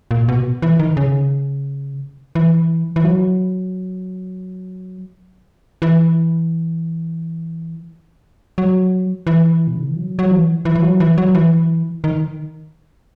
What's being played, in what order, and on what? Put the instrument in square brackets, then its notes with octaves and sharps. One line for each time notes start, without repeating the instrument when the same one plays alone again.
[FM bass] A#2
B2
E3
D#3
C#3
E3
E3
F#3
E3
F#3
E3
B2
C#3
D#3
E3
F#3
F#3
E3
E3
E3
F#3
E3
F#3
E3
D#3